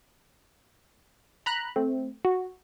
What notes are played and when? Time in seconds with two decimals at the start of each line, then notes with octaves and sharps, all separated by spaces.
1.46 A#5 B5 F#6
1.76 A3 C4
2.25 F#4